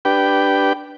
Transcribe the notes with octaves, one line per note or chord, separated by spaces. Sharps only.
D4 G4 B4 G5